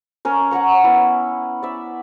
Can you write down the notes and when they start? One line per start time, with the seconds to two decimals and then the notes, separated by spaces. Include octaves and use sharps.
0.25 C#4 A#4
0.51 C#5 F#5 A#5 C#6
0.84 B3 E4
1.63 D5 E5